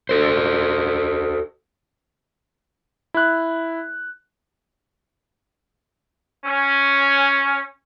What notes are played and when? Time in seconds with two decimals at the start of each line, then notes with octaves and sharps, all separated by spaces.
0.09 F#4 A4 C5
3.14 E4 F#6
6.45 C#4